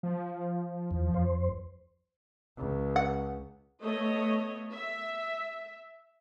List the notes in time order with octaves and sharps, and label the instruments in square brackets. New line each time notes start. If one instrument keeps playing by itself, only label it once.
[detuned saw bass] F3
[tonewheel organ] E2
F2 C5
[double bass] C#2
[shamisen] F#5
[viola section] A3 B3 C#5 D#5
E5